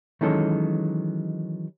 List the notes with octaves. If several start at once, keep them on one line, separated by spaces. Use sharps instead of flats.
D#3 E3 F#3 G#3 C#4 A4